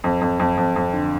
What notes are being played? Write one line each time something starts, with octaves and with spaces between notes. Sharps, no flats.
F2
F2
F2
F2
F2
D3